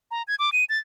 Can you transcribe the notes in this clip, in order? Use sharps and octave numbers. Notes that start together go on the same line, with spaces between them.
A#5
G#6
D6
D#7
A6